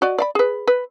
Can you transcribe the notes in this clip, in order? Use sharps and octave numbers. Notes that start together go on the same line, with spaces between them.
F#4 D5 D#5
D5 F5 B5
G#4 B4
B4